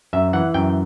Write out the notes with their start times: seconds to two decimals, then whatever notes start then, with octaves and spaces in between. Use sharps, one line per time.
0.13 F#2 E5
0.33 E3 F#5
0.54 F#2 G5